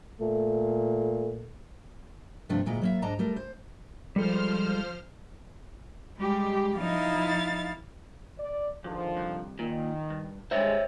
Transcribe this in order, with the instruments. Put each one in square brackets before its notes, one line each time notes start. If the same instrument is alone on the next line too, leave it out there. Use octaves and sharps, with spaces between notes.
[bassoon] A#2 [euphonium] A3
[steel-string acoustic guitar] G2 C3 F3 A3 D4 F4
D2 A#2 G#3 E4 A#5
F#3 A#3 E5
G#2 D4 D#5 A5 A#5
G3 A3 A#4
C5
[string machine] F3 C5 F6 [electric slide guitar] G3 G#3 A4
[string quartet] G3 [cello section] G#3 G4
[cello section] F3 D#4 [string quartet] E4 F5 A6
[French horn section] D5
[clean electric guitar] E2 [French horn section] D3 D#3 F3
[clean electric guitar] C2
[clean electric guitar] A#2 [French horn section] D#3
[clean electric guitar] G2
[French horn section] G2 D#3 G#3 [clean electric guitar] C5 C#5 E5